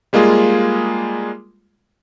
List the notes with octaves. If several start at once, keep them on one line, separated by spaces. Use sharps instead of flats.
G3 G#3 A#3 F4 G#4